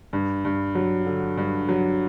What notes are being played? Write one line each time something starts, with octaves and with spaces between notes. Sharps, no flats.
G2
G2
F#3
D3
G2
F#3